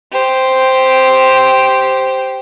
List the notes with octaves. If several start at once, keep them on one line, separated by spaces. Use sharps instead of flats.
G4 C5